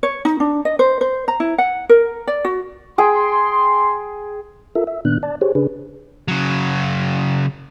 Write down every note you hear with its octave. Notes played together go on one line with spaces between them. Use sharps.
C#5
D#4
D4
D#5
C5
C5
A#5
E4
F#5
A#4
D5
F#4
G#4 G5 C6
F4 A4 A#4 E5
E5
A#2 D#3 B3 D4 F#6
D5 A5
G4 G#4 C5 C#5
C#3 D4 G#4 B4
C#3 F#3